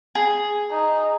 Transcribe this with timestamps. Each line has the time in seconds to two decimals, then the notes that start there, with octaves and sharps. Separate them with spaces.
0.15 G#4
0.72 D#4